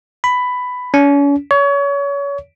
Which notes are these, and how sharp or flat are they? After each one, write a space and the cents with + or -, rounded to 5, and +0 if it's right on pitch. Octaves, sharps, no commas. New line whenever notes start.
B5 +10
C#4 +40
C#5 +30